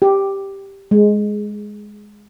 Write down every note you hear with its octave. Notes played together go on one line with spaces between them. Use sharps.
G4
G#3